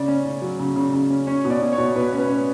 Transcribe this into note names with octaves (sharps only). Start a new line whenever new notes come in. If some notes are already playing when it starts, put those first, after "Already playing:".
Already playing: C#3 D5
C#4
C#3
F#3
C#3
C#3
C#3
C#4
C#4 C#5
B2
D5
B2
C#5
B2
B2 B4
C#4
B4
C#4